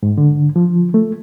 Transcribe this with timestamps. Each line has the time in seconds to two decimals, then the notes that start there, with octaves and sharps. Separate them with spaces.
0.03 G#2
0.18 D3
0.56 F3
0.94 A3